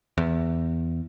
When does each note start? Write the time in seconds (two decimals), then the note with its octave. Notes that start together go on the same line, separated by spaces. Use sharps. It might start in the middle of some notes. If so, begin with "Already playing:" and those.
0.18 E2